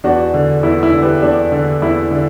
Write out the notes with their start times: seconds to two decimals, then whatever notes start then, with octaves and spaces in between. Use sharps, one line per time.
0.04 E2 D4 F#4
0.34 D3
0.63 E2 E4
0.83 E4
0.93 D3
1.02 G4 B4
1.22 E2 D4
1.52 D3
1.82 E2 E4
2.11 D3